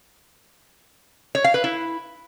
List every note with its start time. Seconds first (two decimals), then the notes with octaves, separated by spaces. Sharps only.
1.35 C#5
1.44 F5
1.54 B4
1.64 E4